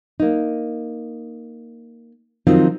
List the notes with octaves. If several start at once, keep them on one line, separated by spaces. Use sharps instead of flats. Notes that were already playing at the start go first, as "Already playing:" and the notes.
A#3 D#4
D#3 F3 F#3 C4 D#4 F4